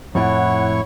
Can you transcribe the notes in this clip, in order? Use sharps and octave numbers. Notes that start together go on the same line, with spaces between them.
F2 A2 E4 C#5 F#5 C#6